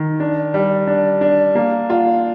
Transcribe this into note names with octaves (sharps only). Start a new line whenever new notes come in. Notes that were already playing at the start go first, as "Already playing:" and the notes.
Already playing: D#3
D4
G3
D4
D4
A#3
F4